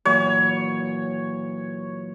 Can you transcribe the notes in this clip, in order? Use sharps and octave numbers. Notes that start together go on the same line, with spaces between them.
A#2 E3 F#3 C#5